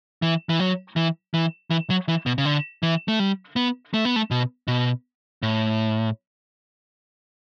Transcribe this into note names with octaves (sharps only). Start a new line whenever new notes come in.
E3
E3
F#3
E3
E3
E3
F#3
E3
B2
C#3
D3
E3
A3
G3
B3
A3
B3
A3
B2
B2
A2